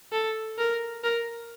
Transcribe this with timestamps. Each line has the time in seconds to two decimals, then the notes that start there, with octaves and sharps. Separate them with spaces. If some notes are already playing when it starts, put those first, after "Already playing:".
0.12 A4
0.58 A#4
1.04 A#4